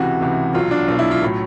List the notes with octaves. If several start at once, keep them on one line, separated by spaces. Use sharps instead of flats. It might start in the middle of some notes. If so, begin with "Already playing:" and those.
Already playing: C#2 C3 E3 F#4
C#2 C3 E3
B1 B2 F#3 F4
D4
B1 B2 F#3 D4
E4
F4
A2 F#3